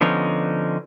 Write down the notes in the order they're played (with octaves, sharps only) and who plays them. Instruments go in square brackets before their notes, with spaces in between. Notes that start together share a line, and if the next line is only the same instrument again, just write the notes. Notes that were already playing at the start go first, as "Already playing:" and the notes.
[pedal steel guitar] D3 F3 B3 C#4 D#4